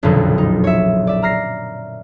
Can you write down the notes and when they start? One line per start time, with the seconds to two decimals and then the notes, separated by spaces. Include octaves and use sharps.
0.03 F#1 B1 F2 A#2 D3 F#3
0.38 D#4
0.64 C#5 E5
1.07 D5 E5
1.22 A#5 F6 A#6 C7